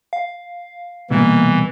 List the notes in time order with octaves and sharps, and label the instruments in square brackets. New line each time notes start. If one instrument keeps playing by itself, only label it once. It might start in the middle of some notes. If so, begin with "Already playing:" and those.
[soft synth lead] F5
[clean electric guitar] C2 B2 [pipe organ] E3 [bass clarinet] A#3